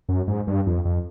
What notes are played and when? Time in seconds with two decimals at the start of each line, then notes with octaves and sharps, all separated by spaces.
0.09 F#2
0.27 G#2
0.47 G2
0.67 F2
0.85 F2